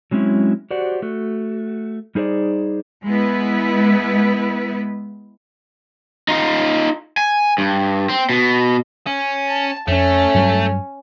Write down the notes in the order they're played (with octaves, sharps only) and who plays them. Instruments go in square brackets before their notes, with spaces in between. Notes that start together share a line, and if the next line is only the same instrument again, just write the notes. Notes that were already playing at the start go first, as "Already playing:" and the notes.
[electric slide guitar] F#3 G#3 C4 C#4 E4
F#4 G4 C5 D5 F#5
A3 F#4
G3 D#4 G#4 C5 D5
[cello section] G#3 B3 E4 B4
[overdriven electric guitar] D#4 F4
G#5
G2
C4
B2
[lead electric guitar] C#4
[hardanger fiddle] A5
[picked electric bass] F2 [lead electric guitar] A3 [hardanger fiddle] C#4
[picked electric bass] G2 F#3 G3